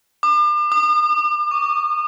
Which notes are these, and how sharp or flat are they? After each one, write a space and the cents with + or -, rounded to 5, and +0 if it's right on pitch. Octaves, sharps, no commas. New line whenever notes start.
D6 +40
D#6 -40
C#6 +35